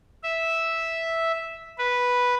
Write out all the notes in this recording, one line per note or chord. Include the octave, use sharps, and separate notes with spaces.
E5
B4